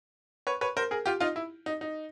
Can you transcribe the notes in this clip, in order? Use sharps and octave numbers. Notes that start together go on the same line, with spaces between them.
B4 C#5
B4 C#5
A#4 C5
G#4 A#4
F4 G4
D#4 F4
E4
D#4
D#4